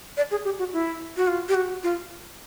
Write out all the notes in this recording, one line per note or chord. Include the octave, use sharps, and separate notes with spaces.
D5
G#4
G4
F#4
E4
F#4
F4
G4
F#4
F4